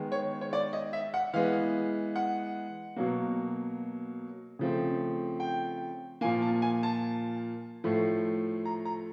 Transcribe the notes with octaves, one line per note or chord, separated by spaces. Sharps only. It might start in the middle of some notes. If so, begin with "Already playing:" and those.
Already playing: D#3 G#3 B3
C#5
C#5
D5
D#5
E5
F#5
E3 G#3 B3 F5
F#5
B2 F#3 A#3
C#3 F3 A3 C4
G5
A#2 F3 A#3 G#5
A5
G#5
A5
A2 F3 A3
A#5
A#5